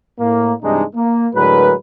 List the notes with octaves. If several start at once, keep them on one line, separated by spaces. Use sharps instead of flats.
A2 A#3
G2 C3 E3 G#3 D4 D#4
A#3
A2 D3 F#3 G#3 A#4 B4